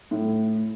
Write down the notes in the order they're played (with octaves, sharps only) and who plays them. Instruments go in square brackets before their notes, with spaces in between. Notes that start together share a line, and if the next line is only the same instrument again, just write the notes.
[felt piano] A2